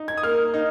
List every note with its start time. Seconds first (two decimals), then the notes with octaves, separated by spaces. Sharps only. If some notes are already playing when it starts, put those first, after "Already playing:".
Already playing: D#4
0.08 G#6
0.17 D#6
0.23 A#3 F6
0.54 D#4